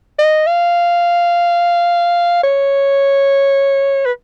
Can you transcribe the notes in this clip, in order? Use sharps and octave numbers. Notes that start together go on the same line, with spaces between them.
D#5
F5
C#5
B4